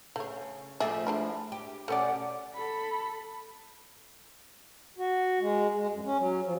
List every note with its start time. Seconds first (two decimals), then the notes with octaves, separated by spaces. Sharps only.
0.16 C#3 A3 C#5
0.80 F3 A3 G4 G#4 E5
1.07 G#3 D4 E4
1.52 G4
1.88 B2 A3 C#4 D5 F#5
2.55 A4 B5
4.98 F#4
5.40 G#3
5.77 G#3
5.91 F#2
6.05 C#4
6.18 F#3
6.45 F3